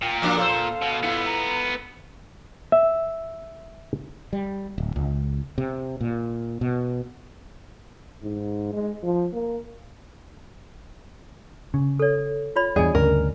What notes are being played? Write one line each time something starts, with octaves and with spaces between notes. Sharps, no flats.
A#2 G5
F3 A#3 D4 D6
A4 C5 F5
B2
B3 E4 F4
A#5
E5
G3
D1
C#2
C3
A#2
B2
G#2
G#3
F3
A#3
C#3
A4 C#5
F4 C#5 B5
E2 G2 G#4 D5 D#5 G#5
D2 G2 C#3 A#4